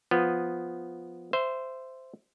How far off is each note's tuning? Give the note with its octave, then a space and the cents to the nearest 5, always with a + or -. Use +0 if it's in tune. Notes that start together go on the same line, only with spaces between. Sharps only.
F3 +5 B3 +0
C5 -10 E5 +10